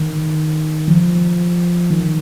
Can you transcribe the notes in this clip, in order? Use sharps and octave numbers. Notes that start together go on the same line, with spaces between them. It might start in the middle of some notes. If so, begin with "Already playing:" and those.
Already playing: D#3
F3
D#3